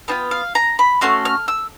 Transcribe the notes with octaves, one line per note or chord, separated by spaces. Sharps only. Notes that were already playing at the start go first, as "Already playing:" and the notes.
B3 D4 F4 G5
F5
A#5
B5
A3 C#4 F#4 C6
F6
E6